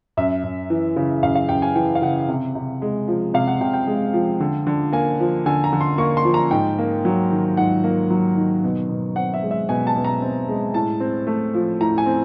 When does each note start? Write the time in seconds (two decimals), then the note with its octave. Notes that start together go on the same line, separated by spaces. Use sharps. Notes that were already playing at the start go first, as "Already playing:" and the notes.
0.17 F#2 E5
0.43 F#2
0.70 E3
0.96 C#3
1.23 F#2 F5
1.35 F5
1.49 F#2 G5
1.62 G#5
1.75 E3 G5
1.95 F5
2.02 C#3 F#5
2.28 C3
2.55 C3
2.82 G#3
3.08 F3
3.34 C3 F5
3.47 F#5
3.60 C3 G5
3.74 G5
3.87 G#3
4.13 F3
4.40 D3
4.67 D3
4.92 A#3 G#5
5.20 F3
5.46 D3 G#5
5.64 A#5
5.73 D3
5.81 C6
5.98 A#3 C#6
6.17 C6
6.25 F3
6.34 A#5
6.51 G#2 G5
6.79 A#3
7.05 F#3
7.31 D#3
7.57 G#2 F#5
7.84 A#3
8.10 F#3
8.37 D#3
8.63 B2
8.89 B2
9.16 C4 F#5
9.34 E5
9.43 G#3
9.51 E5
9.69 B2 G#5
9.87 A5
9.96 B2
10.05 A#5
10.22 C4
10.48 G#3
10.74 A2 A5
11.00 C4
11.27 A3
11.54 F3
11.81 A2 A#5
11.98 G#5
12.06 C4